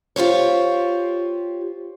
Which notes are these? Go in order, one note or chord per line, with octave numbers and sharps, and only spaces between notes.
F4 G4 C5 C#5